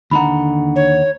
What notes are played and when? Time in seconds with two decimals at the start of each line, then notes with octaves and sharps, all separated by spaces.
0.11 D#2 D3 D#4 F#5 A#5 B5
0.76 C#5